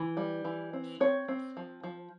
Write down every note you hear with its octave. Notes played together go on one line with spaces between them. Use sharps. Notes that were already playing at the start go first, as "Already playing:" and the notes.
Already playing: E3
G3
E3
C4
C4 C#5
C4
F3
F3